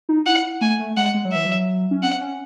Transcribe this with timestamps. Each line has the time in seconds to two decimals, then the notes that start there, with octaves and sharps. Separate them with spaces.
0.09 D#4
0.26 E4 F#5
0.61 A3 G#5
0.79 A3
0.97 G#3 F#5
1.14 G#3
1.25 F#3
1.32 E3 E5
1.46 F#3
1.91 C#4
2.03 C4 F#5
2.21 C#4